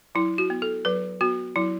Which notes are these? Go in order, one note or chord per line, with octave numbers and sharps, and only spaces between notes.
F#3 E4
F#4
B3
A4
F#3 B4
B3 F#4
F#3 E4